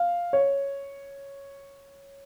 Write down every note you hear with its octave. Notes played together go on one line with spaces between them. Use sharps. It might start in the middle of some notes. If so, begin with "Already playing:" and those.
Already playing: F5
C#5